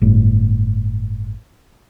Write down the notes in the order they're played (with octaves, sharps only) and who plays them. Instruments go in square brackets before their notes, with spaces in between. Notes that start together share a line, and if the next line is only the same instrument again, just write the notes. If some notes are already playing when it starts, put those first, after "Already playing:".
[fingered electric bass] G1 A2